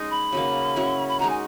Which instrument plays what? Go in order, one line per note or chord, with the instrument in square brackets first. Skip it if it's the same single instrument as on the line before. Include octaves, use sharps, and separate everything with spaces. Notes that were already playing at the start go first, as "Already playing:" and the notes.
Already playing: [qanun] G#3 C#4 D#4 G#4
[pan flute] B5
[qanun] C#3 F#3 A#3
F#3 C#4 E4
[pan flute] B5
[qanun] G#3 D#4 F#4 [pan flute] A#5
[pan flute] G#5